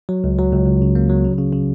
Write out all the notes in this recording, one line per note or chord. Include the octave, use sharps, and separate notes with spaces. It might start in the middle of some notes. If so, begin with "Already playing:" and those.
F#3
C#2
F#3
C#2
C#2
C#3
A#3
F#3
C#3
C#3
C#3